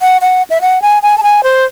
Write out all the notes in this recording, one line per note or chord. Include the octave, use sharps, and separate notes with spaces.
F#5
F#5
E5
F#5
G#5
G#5
A5
G#5
C5